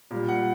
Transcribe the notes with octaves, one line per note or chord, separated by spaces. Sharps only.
A#2 G3
F#5